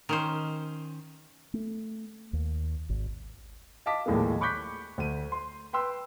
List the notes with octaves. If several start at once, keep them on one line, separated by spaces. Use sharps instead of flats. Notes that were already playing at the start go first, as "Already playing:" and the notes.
D#3 C#4 C5
A3
D#2
G#1
D#5 F5 A5 D6 B6
A#1 D#2 A2 G#3 A#3
B5 C#6 D6 F#6 G6 B6
D2 D#7
C6
B4 G5 C6 E6